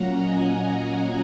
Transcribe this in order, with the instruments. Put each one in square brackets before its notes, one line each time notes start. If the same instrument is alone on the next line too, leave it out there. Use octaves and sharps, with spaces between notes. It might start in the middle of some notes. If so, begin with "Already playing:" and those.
Already playing: [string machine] A#2 F#3 A#3 C#4 F#5 A#5
D#5 G#5